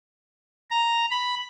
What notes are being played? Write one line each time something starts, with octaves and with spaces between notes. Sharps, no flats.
A#5
B5